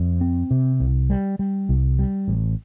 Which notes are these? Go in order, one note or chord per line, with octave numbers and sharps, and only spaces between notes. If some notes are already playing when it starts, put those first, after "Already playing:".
Already playing: F2
C4
C3
C2
G3
G3
C2
G3
A1